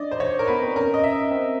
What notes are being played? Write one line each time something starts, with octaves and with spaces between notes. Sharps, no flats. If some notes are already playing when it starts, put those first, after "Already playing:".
Already playing: D4 D5 D#5
C5
C#5
A#4
B3 B4
C4
C#4 A#4
D#5
E5
C4